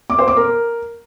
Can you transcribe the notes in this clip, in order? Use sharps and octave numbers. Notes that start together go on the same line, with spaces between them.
D6
C5
D6
A#4